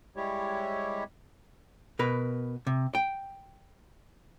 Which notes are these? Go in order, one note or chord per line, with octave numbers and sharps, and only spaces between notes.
G3 G#3 E4 G4 C#5
B2 A#4 B4
C3
G5